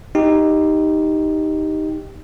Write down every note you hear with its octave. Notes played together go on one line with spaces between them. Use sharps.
D#4 G4